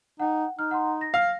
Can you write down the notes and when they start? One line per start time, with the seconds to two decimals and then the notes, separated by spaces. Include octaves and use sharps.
0.20 D#4 F#5 G5
0.59 D#4 F6
0.71 F#5 A#5 C6
1.01 A#6
1.14 F5